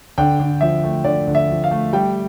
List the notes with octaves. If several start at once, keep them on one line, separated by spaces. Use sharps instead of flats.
D3 G5
D3
F3 E5
A3
D3 D5
D3
E5
F3
F5
A3
G3 G5